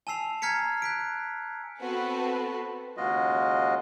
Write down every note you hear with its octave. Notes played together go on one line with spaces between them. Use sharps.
G#5 A5 E6 C7 F7
G#5 A#5 F6 G#6 B6 C#7
F#6 B6 D7
B3 C4 F#4 A4 B4
D#2 C#3 G#3 F4 F#4 D#5